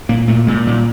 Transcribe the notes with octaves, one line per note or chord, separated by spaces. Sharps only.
A#2 A#3
A#2 A3
A#2 G#3
A#2 G3